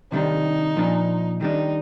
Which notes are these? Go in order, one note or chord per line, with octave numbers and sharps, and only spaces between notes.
C3 D#3 G3 D4 D#4
A#2 F3 A#3 D4
D#3 G3 D4 D#4